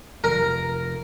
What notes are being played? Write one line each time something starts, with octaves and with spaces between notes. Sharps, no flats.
F1 A#4